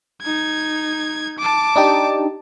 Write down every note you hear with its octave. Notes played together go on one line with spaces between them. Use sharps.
D#4 G#6
A5 D6
D4 D#4 G4